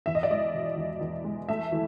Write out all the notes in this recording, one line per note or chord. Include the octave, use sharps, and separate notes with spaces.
E2 E5
D#5
D5
G#3 D#5
B2
E2
E2
G#3
A3 E5
E3